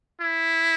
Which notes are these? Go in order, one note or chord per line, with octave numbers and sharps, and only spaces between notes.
E4